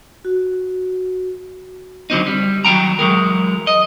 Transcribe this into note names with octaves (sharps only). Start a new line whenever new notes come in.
F#4
D3 F#3 C4 D#4
G3
D#3 F#3 D#4 G5 A#5
E3 F#3 G#3 A#4
D#5